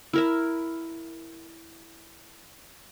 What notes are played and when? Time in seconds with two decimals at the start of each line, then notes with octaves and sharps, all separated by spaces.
0.13 E4 A#4 E5